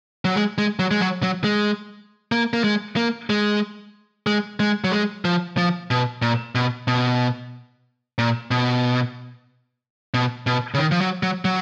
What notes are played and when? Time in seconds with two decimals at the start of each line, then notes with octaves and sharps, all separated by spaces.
0.25 F#3
0.36 G#3
0.58 G#3
0.79 F#3
0.91 G#3
1.01 F#3
1.23 F#3
1.44 G#3
2.32 A#3
2.53 A#3
2.64 G#3
2.97 A#3
3.30 G#3
4.27 G#3
4.60 G#3
4.84 F#3
4.92 G#3
5.25 F3
5.57 F3
5.91 B2
6.22 A#2
6.55 B2
6.88 B2
8.18 A#2
8.51 B2
10.14 B2
10.47 B2
10.74 C#3
10.78 D#3
10.92 F3
11.01 F#3
11.23 F#3
11.45 F#3